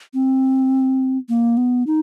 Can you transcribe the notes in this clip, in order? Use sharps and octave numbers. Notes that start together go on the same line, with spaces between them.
C4
A#3
B3
D#4